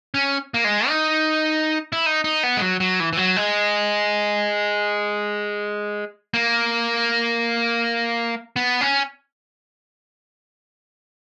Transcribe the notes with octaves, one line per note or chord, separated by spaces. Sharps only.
C#4
A#3
G#3
D#4
E4
D#4
D#4
B3
G#3
F#3
F#3
E3
E3
F#3
G#3
A#3
B3
C#4